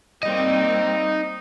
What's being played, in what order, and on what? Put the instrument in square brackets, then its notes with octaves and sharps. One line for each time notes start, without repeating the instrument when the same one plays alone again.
[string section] G3 A#3 C4 [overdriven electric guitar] D#4 D#5